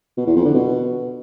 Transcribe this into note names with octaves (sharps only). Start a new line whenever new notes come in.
B2
E2
F2
D3
B2